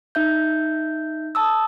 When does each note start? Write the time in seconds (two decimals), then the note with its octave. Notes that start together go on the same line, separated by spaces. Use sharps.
0.15 D#4 E5 G6
1.35 A5 D#6 E6